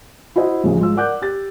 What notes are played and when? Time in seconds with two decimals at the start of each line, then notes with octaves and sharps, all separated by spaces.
0.36 E4 F#4 C5 D#5
0.64 A1 D2 C#3 F3
0.79 G#2 F4 E6
0.96 A#4 D5 F#5 D6 F#6 G6
1.22 G4 A6